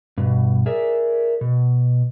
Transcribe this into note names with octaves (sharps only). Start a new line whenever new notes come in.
G2 B2
G#4 A#4 D5 E5
B2